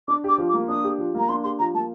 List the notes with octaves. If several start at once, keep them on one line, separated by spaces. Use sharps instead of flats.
D4 D6
G4 D6
F3
D6
A#3
D4 D#6
G4
F3
A#3 A#5
D4 C6
G4 C6
F3 A#5
A#3 A5